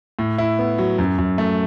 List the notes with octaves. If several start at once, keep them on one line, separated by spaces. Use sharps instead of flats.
A2
E4
B3
F#3
F#2
F#2
A3